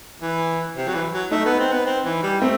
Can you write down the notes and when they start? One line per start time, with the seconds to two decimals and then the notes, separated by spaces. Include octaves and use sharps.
0.21 E3
0.77 C3
0.88 F#3
0.94 E3
1.12 F#3
1.31 A3 D#4
1.46 B3
1.59 C4
1.72 B3
1.86 C4
2.05 E3
2.23 G3
2.41 A3 C4